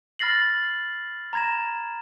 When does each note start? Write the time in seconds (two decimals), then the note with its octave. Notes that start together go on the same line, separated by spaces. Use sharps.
0.19 B5 F6 A6 A#6 C7 F#7
1.33 A#5 B5 G#6 A#6 E7